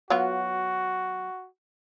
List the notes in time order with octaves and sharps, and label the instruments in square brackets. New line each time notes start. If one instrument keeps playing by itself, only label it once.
[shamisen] F#3 B3 F4 [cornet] F#4